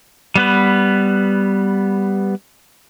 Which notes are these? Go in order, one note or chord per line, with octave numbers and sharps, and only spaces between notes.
G3 B3 B4